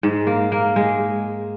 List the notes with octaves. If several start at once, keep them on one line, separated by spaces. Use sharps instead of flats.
G#2
A#3
A#3
G#3